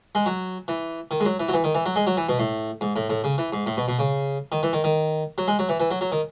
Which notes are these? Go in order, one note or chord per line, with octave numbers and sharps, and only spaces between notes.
G#3
F#3
E3
D#3
G#3
F#3
E3
F#3
E3
D#3
E3
F#3
G#3
F#3
E3
B2
A2
G#2
A2
A2
C#3
E3
G#2
A2
B2
B2
C#3
D#3
E3
D#3
D#3
F#3
G#3
F#3
E3
E3
F#3
F#3
D#3